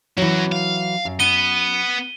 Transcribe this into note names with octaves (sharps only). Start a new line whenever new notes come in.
E3 F#3 C#4 F#4
F5
F#2
B3 D#7 G7